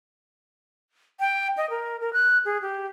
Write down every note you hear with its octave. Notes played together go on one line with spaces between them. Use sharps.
G5
D#5
A#4
A#4
F#6
G#4
G4